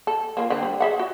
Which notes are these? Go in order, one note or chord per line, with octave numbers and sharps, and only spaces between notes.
A4
A#3 C4 F4
D3 C4
G3
G#4 E5 F#5
F#4